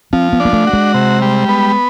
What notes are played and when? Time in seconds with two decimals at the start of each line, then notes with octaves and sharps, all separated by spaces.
0.13 F3 C4
0.33 B3
0.40 D4
0.45 A#3
0.53 A3
0.67 F#4
0.73 G#3
0.94 C3
1.22 G3
1.48 B3